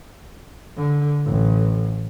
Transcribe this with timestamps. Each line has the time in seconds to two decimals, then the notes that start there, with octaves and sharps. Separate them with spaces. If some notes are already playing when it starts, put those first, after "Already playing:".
0.77 D3
1.26 A1